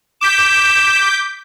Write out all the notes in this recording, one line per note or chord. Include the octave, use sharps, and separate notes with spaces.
D6 G6 B6 E7